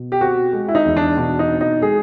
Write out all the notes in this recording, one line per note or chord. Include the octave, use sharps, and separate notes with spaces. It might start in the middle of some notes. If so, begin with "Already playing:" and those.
Already playing: B2
G4
C4 F#4
G#3
E4
D#4
E2
D4
B2 D4
D#4
C4
D#4
G#3 G#4